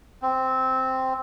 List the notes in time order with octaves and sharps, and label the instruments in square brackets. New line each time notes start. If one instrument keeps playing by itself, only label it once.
[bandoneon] C4